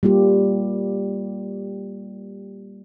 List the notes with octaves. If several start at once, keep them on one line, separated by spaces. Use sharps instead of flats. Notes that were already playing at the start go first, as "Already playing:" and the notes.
G3 A#3 F4 G4